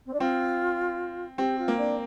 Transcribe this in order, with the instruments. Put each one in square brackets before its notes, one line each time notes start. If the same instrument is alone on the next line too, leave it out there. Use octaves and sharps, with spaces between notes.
[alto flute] C4
D4
[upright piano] C4 [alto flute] F4
[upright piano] C4 [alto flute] G4
[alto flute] F4
[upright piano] A#3
[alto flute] D4